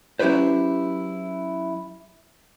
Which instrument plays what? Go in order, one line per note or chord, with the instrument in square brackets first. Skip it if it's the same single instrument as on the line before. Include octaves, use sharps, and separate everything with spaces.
[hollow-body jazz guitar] F#3 C#4 E4 G4 B4 C5